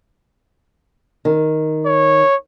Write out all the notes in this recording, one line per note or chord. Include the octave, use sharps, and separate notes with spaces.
D#3
C#5